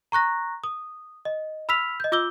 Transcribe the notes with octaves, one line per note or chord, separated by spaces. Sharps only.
A#5 C#6 F#6 A#6
D#6
D#5
B5 E6 F6 B6 F7
D#5 G6
F4 D6 E6 G6 G7